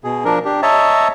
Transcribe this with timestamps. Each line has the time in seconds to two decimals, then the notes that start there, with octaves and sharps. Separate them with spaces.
0.04 B2 G#4
0.25 F3 D4 A#4
0.45 D4 G4
0.62 C#5 D#5 E5 A5 A#5